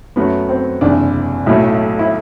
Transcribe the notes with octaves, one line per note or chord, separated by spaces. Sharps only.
F#2 F#3 A3 B3
C4
F#1 E2 C3 D4
B1 A2 F#3 A3 E4
E4